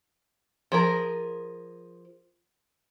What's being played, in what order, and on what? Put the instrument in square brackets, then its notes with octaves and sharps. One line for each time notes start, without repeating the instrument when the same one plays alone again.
[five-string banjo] F3 G#4 A#4